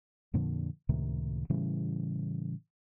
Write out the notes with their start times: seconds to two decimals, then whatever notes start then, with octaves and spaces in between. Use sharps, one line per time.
0.34 F2 A#2 D3 F3
0.89 C#2 A2 C3 D#3
1.50 A2 C#3 E3 G3